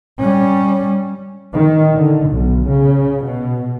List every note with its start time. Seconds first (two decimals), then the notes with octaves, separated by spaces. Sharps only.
0.20 G3 C#4
1.54 D#3
1.95 D3
2.30 B1
2.69 C#3
3.24 B2